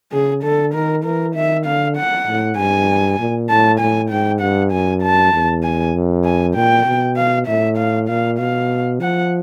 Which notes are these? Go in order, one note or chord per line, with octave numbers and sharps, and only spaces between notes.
C#3 G#4
D3 A4
D#3 A#4
E3 A#4
D#3 E5
D3 F5
F#5
A2
G2 G#5
A#2
A2 A5
A2 G#5
G#2 G5
G2 F#5
F#2 G#5
A5
E2
G#5
F2
G#5
A#2 G5
B2
F5
A2 E5
F5
A#2 F5
B2 F5
F3 F#5